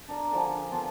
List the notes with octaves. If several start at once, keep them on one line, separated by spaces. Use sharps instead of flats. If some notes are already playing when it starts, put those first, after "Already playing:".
D4 A#4
D3 F3 D4 G#4
F3 B3 F4